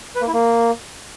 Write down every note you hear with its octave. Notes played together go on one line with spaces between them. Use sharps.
B4
A#3
E4
A#3